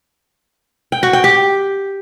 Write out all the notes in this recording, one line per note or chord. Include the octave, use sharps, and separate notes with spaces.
G5
F#4
G5
G4